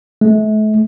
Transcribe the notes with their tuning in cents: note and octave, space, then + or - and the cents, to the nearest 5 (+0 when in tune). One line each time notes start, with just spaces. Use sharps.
A3 -40